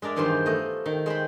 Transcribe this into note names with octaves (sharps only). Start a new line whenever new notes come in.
G#3 D4 A#4 D5 E5
E2 G2 D#3 F4 C5 C6
A3 D#5
D#3
G#3 C5 G5 B5